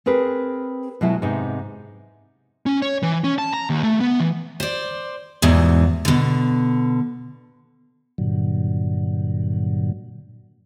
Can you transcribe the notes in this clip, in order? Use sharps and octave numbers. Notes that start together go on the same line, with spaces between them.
C4 G#4 A#4 B4
B2 F#3 G#3 E4 A4
G#2 C3 B3 D#4
C#4
C#5
E3
C#4
A5
A#5
D#2
A3
B3
E3
C5 D5
E2 G#2 B2 E3
B2 D3
G2 A#2 D3 F#3